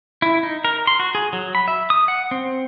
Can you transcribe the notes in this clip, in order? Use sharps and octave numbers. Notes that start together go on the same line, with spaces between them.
E4
D#4
A#4
C6
F#4
G#4
F#3
B5
E5
D#6
F#5
C4